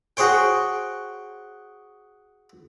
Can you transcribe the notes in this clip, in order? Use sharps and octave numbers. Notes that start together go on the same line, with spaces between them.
F#4 G#4 C5 C#5 G5